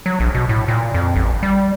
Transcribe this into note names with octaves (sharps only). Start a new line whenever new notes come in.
F#3
A#1
B2
A2
A#2
F2
A1
G3